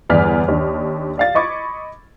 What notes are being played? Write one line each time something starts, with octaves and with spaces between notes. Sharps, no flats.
G1 E2 D5 F6 B6
D#2 D4
D5 F5 A6
D#5 B5 C#6 D6 G#6